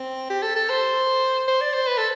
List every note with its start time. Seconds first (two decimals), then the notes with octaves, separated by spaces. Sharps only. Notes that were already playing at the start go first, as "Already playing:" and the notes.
Already playing: C4
0.30 G4
0.42 A4
0.56 A4
0.69 C5
1.48 C5
1.61 D5
1.74 C5
1.87 B4
1.98 A4